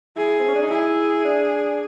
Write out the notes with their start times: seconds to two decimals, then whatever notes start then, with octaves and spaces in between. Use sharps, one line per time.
0.16 E4 G#4
0.39 C4
0.48 C#4
0.55 D4
0.62 D#4
0.71 E4 G#4
1.25 D4